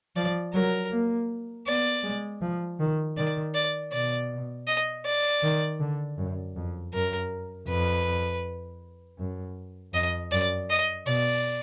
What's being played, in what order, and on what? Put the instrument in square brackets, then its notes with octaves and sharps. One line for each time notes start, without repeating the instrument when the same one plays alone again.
[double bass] F3 [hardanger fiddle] D5
[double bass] F#3 [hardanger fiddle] A#4
[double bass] A#3
[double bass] B3 [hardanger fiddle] D5
[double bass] G#3
F3
D#3
[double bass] D#3 [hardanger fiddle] D5
[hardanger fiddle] D5
[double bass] B2 [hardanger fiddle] D5
[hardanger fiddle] D#5
D5
[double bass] D#3
D3
F#2
F2
[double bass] F#2 [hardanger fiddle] A#4
[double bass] F2 [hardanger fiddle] B4
[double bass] F#2
[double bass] F2 [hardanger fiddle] D#5
[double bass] F#2 [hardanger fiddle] D5
[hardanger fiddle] D#5
[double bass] B2 [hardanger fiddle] D5